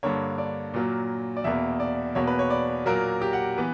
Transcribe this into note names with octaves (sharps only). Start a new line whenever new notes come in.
G2 D3 A#3 C#5
D5
A#2 F#3 A#3
D5
E2 B2 A#3 E5
D5
E2 B2 A#3 C#5
B4
C#5
D5
A#2 F#3 A#3 A#4
G4
F#5
E3 B3